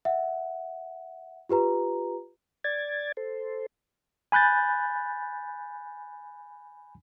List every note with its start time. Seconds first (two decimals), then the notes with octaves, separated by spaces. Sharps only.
0.05 E5 F#5
1.49 F4 G4 B4 A#5
2.64 D5 G#6 A6
3.17 A4 C5
4.32 G#5 B5 F#6 G6 A6